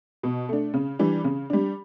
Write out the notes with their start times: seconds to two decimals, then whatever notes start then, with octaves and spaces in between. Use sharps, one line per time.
0.23 B2
0.49 A3 D4
0.74 C#3
0.99 E3 G3 D4
1.24 C#3
1.50 G3 D4